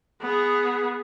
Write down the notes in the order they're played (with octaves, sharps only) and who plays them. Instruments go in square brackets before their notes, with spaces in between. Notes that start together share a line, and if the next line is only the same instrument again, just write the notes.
[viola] B3 G#4